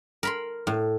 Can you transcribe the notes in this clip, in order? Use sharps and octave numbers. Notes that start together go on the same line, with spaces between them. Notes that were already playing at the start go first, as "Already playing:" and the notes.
A#4 B5 C6
A2